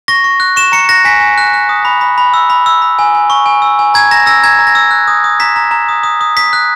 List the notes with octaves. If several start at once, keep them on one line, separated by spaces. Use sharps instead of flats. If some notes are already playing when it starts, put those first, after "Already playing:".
C#6 A#6
C#6
F#6
C#6 E7
A#5 C#7
F#6 A#6
G#5 B6
G#5
F#6
F#6
D#6
B5
B5
B5
E6
B5
E6
B5
G#5
G#5
C#6
G#5
E6
G#5
A#5 G#6
A#5 A#6
E6 A#6
A#5 G#6
A#5
A#6
E6
F#6
D#6
D#6
A#5 B6
A#5
A#5
D#6
D#6
D#6
D#6 B6
F#6